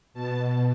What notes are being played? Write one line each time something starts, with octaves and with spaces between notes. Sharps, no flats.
B2 A5